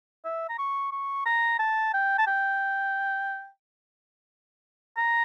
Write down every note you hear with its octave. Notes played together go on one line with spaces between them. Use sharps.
E5
A#5
C#6
C#6
A#5
A5
G5
A5
G5
A#5